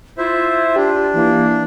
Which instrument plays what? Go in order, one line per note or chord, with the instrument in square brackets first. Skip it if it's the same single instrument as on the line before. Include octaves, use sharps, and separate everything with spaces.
[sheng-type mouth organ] E4 C5 E5 [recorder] F4
[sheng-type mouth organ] D4 [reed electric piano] G4
[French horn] E3 [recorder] A#3